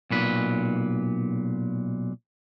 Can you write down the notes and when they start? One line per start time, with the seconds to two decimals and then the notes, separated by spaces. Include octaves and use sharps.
0.11 B1 A#2 B4